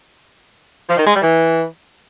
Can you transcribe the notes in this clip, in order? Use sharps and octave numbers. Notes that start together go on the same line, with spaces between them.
F3
D#3
G#3
G3
E3